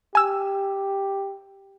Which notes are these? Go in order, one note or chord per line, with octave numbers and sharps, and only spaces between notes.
G4 G#5 E6